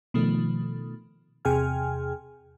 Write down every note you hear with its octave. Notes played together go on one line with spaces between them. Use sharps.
B2 D#3 F3 A3
E2 C3 G#4 G5 G#5 F6